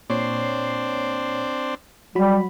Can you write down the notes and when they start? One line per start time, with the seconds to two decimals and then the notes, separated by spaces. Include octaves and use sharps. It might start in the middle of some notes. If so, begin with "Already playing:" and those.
0.10 A#2 C4 D4 C#5 C7
2.15 F#3 G3 F#4 B5